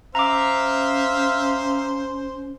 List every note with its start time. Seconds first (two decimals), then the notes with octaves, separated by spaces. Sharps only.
0.15 C#4 C5 E5 F5 A#5 D6